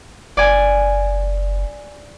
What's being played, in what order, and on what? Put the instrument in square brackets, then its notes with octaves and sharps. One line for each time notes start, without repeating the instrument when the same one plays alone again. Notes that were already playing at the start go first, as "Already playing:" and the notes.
[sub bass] F#1 [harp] D5 G#5